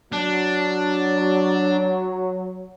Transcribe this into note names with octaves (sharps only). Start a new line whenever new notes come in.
F#3 D4